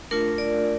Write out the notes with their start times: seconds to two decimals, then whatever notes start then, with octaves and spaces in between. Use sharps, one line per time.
0.11 A3 D4 F4 A#4
0.38 D5